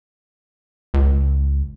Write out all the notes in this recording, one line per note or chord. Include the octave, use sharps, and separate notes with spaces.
C#2